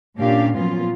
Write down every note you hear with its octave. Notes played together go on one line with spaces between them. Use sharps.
A#2 C#4 D4 G4 F5
A#2 F3 F#3 B3 C#4 F4